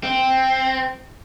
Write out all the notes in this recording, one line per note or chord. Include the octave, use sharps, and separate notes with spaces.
C4